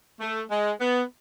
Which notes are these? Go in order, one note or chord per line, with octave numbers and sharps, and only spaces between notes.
A3
G#3
B3